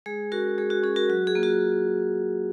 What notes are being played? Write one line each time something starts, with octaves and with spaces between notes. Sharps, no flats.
G#3 G#4
C#4 F#4 A#4
G#3 G#4
F#4
C#4 F#4 G#4
F#4 A#4
F#3 F#4
G#4
A#3 F4
F#4